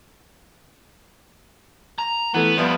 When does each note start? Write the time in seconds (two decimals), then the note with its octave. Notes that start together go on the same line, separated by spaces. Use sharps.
1.99 A#5
2.34 E3 A3 B3
2.58 F3 G3 B3 F4 E5